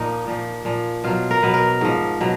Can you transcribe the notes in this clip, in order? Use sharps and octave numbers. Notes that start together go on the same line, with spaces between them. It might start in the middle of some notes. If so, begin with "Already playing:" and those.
Already playing: A#2 F3 A#3 D#4
A#2 F3
A#2 F3
B2 F#3 F4
A#4
B2 F#3 B4
A#4
G#2 F3
B2 F#3